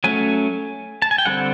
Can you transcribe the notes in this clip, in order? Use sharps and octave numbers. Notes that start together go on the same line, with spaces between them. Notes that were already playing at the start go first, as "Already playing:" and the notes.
F#3 A3 C#4 G#5
A5
G#5
G5
D3 G3 C4 F#5